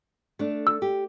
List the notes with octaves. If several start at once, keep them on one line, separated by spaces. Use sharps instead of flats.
A3 D4
E6
G4